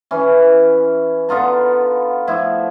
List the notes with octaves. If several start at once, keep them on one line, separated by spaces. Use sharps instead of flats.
E3 C#4
D3 B3 F4 A#5
F3 A3 E4